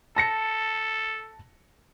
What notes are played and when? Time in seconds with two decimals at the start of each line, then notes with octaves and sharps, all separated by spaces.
0.16 A4 A5 A#6 C#7